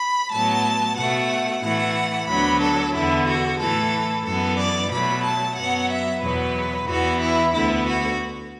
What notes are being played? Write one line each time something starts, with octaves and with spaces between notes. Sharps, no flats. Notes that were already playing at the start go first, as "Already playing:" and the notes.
Already playing: B5
A2 F#3 B3 A5
B2 A3 F#5
A2 E3 A3 F#5
D2 D3 F#3 B3 B5
A4
E2 D3 B3 E4
F#4
A2 E3 A3 A4
F#2 E3 B3 A4
D5
B2 F#3 A3 B5
A5
F#2 F#3 B3 F#5
E5
E2 B2 F#3 B3 B4
E2 E3 B3 F#4
E4
D2 D3 B3 E4
F#4